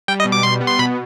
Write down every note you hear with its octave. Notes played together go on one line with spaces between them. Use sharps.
G3 G5
D#5
B2
D6
G3 C6
B3
C6
B2 B5